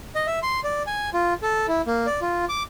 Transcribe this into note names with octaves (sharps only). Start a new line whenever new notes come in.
D#5
E5
C6
D5
G#5
F4
A4
E4
A#3
D5
F4
D6